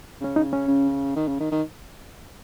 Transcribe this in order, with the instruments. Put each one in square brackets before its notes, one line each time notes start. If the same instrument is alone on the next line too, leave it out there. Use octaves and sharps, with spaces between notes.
[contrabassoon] C#3 [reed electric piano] C#4
[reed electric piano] D#4
C#4
[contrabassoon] C#3
D#3
C#3
D#3
D#3